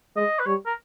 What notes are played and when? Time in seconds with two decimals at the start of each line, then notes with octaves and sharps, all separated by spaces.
0.16 G#3 D#5
0.39 B4
0.46 G3 C#5
0.66 A#4